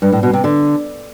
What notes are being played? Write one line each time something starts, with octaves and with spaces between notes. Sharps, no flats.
G2
A2
B2
C3
D3